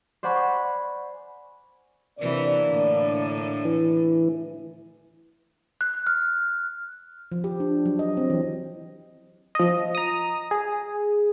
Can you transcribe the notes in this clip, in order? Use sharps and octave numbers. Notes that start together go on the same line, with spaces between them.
C5 D5 F#5 G#5 B5 C#6
C3 E3 A#3 D4 D5
A2 D3
E3
F#6
F6
F3
G4
D4
F#3
D#5
C4
E3
F3 D#5
A#5 D#6
G#4